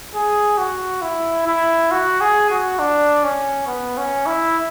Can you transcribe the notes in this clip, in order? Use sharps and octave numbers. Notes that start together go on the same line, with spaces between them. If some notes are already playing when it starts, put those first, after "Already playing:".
G#4
F#4
E4
E4
F#4
G#4
F#4
D4
C#4
B3
C#4
E4